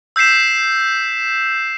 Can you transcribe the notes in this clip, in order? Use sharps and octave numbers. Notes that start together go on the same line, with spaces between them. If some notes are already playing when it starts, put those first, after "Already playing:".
E6 G6 B6 C7 E7